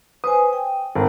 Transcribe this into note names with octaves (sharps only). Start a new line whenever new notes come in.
B4 C5 G#5 D#6
G5
G#1